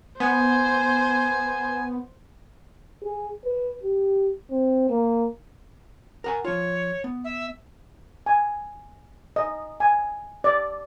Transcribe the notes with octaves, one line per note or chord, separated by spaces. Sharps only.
B3 C5 G#5
G#4
B4
G4
C4
A#3
A#4 F#5 G#5
F3 F4 C#5
B3
E5
G#5
D#5
G#5
D5